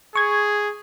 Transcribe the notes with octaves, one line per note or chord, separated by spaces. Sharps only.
G#4 C#6 G#6